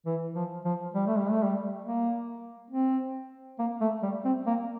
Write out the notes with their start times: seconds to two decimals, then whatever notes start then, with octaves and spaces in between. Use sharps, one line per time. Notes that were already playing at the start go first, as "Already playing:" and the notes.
0.06 E3
0.35 F3
0.65 F3
0.94 G3
1.07 A3
1.18 G3
1.31 A3
1.43 G3
1.82 A#3
2.71 C4
3.59 A#3
3.81 A3
4.03 G3
4.25 C4
4.47 A#3